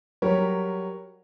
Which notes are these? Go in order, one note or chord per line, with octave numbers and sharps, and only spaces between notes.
F#3 G3 G4 A#4 C#5